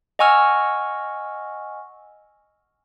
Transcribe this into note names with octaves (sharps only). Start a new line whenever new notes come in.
D#5 F#5 G#5 C#6 E6 F6